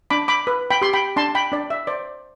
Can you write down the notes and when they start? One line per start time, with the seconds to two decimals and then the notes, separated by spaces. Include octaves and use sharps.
0.10 D4 B5 D6
0.28 B5 D6
0.47 B4
0.71 G5 B5
0.82 G4 C6
0.93 G5 B5
1.16 D4 A5 C6
1.35 G5 B5
1.52 D4 D5
1.70 E5
1.87 C5 D5